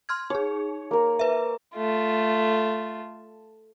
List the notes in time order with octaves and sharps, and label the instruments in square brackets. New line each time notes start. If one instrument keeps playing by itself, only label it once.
[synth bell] C6 F6 G#6
[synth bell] D#4 G#4 [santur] C#5
[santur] A#3 A#4
[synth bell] B4 E5
[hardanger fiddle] A3 F4